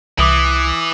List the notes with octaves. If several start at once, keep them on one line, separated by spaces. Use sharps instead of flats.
C2 E3 D6 D#6 F#7